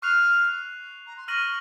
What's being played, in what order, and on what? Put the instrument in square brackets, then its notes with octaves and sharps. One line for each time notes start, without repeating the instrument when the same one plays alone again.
[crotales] C#6 F#6 C7 F7 [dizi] F6
[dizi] A#5
C6
[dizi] C#6 [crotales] F6 A#6 D#7 F#7